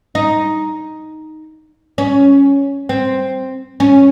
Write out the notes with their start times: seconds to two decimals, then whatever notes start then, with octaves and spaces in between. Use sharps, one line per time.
0.15 D#4
1.98 C#4
2.89 C4
3.80 C#4